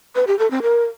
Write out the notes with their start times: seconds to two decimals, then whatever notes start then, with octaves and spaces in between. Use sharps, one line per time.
0.15 B4
0.27 G4
0.39 A4
0.51 C4
0.62 A#4